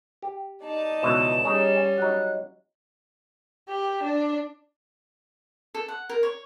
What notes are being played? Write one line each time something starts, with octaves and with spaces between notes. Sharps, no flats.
G4
D#4 D5 A5
C#2 B2 E3 E7
G3 C#4 D#4 G#4 C#5
F#3 D#4 F#6
G4
D4
A4
F#5
A#4
C#5